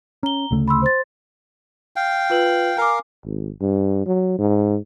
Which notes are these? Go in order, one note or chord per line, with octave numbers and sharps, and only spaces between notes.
C#4 A#5 G7
D2 C#3 A3
B5 C6 E6
C5 C6 A6
F5 G5
F4 B4 F#7
A#4 F5 G#5 D6
G#1
G2
F#3
G#2